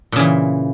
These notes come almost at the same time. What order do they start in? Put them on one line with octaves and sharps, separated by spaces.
A#2 C#3 E3